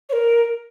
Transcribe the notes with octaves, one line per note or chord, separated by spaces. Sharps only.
C#5
A#4